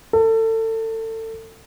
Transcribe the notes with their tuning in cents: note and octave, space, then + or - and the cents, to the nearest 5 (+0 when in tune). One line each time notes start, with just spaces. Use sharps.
A4 +30